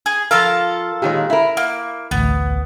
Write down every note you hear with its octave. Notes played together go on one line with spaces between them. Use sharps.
G#4
F3 F4 A4 A#4 F5
A#2 D#3 G#3 G4 C#5
E4 A#4 E5
A#3
A1 D2 B3